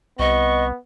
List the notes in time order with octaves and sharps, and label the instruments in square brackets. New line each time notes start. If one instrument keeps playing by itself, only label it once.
[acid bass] C2 [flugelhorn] B3 [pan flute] D#5 [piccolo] C#6